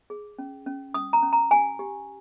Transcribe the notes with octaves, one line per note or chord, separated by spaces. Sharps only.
G#4
C#4
C#4
C#4 D#6
A#5
C#4
A#5
G4 G#5
G4